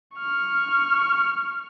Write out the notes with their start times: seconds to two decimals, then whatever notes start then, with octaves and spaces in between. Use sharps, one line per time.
0.18 C#6 F6